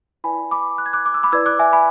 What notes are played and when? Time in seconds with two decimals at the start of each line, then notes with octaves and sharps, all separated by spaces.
0.24 E4 B4 D5 G#5 B5
0.51 B5 D6
0.78 F#6
0.86 G#6
0.93 D6 F#6
1.06 D6
1.14 E6
1.23 B5 D6
1.32 E4 B4 D5 E6 G#6
1.46 D6 F#6
1.59 E5 G#5
1.73 G#5 B5